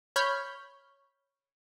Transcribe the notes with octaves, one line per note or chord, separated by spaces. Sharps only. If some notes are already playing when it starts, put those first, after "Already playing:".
C#5 B5 F6 G6